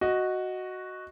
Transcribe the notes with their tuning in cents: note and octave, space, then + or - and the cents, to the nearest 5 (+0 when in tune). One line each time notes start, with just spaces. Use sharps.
F#4 +0 D#5 +0